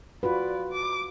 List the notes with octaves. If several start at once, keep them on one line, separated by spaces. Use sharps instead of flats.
F4 F#4 B4 D5
D6